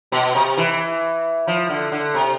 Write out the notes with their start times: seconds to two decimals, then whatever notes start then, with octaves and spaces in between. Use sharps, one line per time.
0.12 B2
0.35 C3
0.58 E3
1.48 F3
1.70 D3
1.92 D3
2.14 C3